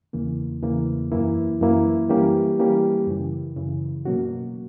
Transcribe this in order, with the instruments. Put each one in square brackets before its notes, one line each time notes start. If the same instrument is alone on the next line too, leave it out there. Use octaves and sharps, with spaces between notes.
[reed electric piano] E2 C#3 E3 A#3
E2 C#3 E3 A#3
F#2 E3 A#3 E4
F#2 E3 A#3 E4
E3 G3 A#3 C#4 G4
E3 G3 A#3 C#4 G4
F#2 C#3 E3
F#2 C#3 E3
B2 F#3 A#3 C#4 F#4